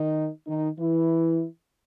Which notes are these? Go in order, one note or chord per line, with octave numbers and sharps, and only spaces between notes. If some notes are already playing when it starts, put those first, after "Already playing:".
Already playing: D#3 D#4
D#3 D#4
E3 E4